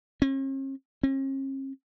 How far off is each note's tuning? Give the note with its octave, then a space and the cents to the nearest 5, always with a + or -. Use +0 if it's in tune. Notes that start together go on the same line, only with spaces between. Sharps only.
C#4 -45
C#4 -45